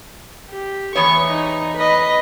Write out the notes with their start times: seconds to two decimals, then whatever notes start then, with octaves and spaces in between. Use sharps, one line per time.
0.49 G4
0.96 E2 B3 C#5 C#6
1.28 D#4
1.77 B4 D#5